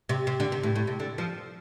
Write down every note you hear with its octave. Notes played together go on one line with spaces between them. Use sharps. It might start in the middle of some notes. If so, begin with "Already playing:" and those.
C3
C3
D3
C3
A2
A2
C3
D3
F3